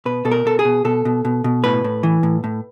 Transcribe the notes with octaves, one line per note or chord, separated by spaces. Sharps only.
B2 B4
B2 A4
A#4
B2 A4
G#4
B2
B2 A4
B2
B2
B2
A2 B4
A2
E3
A2
A2